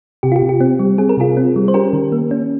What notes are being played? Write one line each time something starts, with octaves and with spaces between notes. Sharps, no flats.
C3 G4
F4
G4
C3
G4
C4
G3
C4 G#4
A#4
C3 F4 G#4
C4
G3
C5
C#4 G4 A#4
D#3
A#3
C#4